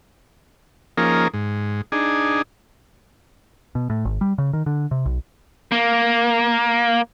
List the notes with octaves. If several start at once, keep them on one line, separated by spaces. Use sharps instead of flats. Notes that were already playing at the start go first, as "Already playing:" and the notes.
F3 A#3 C#4 D#4 G#4 A#4
G#2
D4 D#4 G#4
B2
A2
G#1
G3
C#3
D#3
D3
C3
B1
A#3